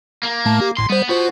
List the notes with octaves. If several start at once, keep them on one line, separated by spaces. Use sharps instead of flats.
A#3
A2 A3 A5
G4
G#1 A2 C6 C7
G3 B3 C5
B3 F4 F#4 C5